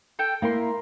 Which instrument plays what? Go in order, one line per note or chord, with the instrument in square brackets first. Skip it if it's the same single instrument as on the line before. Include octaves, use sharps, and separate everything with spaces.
[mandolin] A4 G5
[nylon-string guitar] A#3 E4 [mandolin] A#4 C6